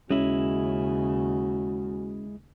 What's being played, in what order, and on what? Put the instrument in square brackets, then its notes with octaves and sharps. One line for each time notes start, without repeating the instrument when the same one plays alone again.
[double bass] D#2 C#3 [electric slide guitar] G#3 E4 [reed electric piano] C#4 [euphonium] F#4